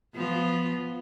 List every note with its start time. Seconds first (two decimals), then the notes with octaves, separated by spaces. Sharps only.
0.14 F3 B3 F4